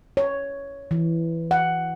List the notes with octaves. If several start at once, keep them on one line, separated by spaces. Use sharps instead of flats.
C#5
E3
F#5